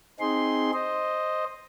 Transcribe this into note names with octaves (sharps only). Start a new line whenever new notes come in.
C4 D#4 G#4 C6
C5 D#5